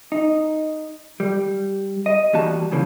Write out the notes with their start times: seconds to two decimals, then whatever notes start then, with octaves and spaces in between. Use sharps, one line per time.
0.12 D#4
1.20 G3
2.06 D#5
2.33 E3 G3 A#3 F#4 A5
2.72 C#3 E3 F3 A#3